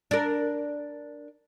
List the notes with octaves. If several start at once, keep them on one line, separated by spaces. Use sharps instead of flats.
D4 A#4